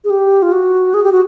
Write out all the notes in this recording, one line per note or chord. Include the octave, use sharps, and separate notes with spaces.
G#4
G4
F4
F#4
G#4
G4
F#4